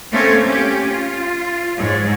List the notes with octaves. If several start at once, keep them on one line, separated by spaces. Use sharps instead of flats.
A3 A#3 C4 C#4 C5 C#5
C#4 G4
F4
G#2 C#5